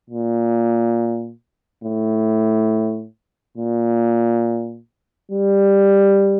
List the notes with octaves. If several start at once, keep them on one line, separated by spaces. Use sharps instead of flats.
A#2
A2
A#2
G3